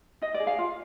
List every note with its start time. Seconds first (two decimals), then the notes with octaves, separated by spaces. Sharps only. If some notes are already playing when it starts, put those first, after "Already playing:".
0.22 D#4 D#5
0.34 D5
0.40 G#4
0.47 F5
0.59 F4